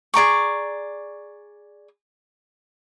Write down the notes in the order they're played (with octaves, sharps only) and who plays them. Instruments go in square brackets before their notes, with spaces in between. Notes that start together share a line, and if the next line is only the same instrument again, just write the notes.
[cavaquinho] G#4 D5 A#5 C#6